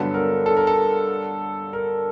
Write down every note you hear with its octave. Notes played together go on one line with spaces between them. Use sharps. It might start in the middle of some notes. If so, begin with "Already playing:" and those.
Already playing: G2 D3 F#3 B3 A4
A#4
A4
A#4
A4
A#4